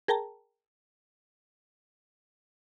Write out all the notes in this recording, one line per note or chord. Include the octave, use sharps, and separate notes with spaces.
G#4 A#4 G5 A5 A#5